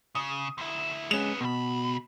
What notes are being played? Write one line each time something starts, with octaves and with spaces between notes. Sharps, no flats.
C#3 D#6
D2 E4
G#3 C#4 G#4 B4 E7
C#2 B2 B5